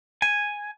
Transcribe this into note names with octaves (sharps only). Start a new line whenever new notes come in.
G#5